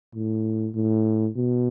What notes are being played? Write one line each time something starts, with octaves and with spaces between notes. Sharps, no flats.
A2
A2
B2